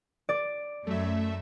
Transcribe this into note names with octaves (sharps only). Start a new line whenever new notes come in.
D5
F#2 A3 E5